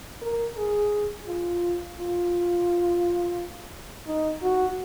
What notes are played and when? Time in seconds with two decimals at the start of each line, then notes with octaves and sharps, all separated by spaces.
0.22 A#4
0.57 G#4
1.26 F4
1.96 F4
4.07 D#4
4.42 F#4